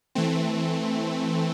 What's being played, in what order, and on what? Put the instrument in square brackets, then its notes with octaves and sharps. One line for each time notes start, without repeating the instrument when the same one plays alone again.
[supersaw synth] E3 A3 C4